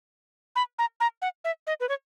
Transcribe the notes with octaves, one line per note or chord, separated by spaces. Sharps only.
B5
A#5
A#5
F#5
E5
D#5
B4
C#5